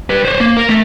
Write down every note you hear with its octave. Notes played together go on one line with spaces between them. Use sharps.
G3 B4
C5 C#5
A#3
A#4
A3